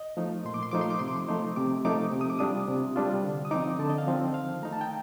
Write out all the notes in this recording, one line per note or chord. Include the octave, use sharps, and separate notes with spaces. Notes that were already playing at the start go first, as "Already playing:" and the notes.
Already playing: D#5
F3 A3 D#4
A#2 C6
D6
C6
F3 A3 D#4 D6
C6
D6
C3 C6
D6
C6
F3 A3 D#4
C3 D6
F3 A3 D#4 D6
C3
D#6
D6
G3 D4 F4 D#6
C3
G3 D4 F4
D3
D#6
F3 C4 D#4 D6
D3 A5
D#5
F5
F3 C4 D#4
D#3 F5
A3 D#4 A#5
A5
G5